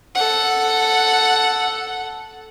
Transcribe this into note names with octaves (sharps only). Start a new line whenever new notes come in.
A4 F#5